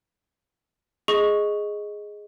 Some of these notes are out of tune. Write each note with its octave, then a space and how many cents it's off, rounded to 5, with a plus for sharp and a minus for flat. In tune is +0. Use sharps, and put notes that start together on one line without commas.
G#4 +0 D#5 +0 C#6 +0